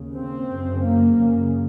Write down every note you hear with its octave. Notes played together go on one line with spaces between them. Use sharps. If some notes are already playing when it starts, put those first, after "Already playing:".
Already playing: D#2 C#3
C4
F#2 C#3
A#3
F#2 C#3